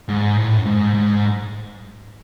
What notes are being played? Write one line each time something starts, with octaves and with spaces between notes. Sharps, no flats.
G#2
A2
F#2
G#2
G#2